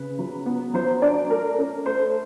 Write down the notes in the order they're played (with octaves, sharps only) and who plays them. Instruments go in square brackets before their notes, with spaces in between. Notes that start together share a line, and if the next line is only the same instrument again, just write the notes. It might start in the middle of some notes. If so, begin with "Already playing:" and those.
Already playing: [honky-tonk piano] C#3 B4
F#3
B3
F#3 C5
D4 D5
A3 A#4
C#4
A3 C5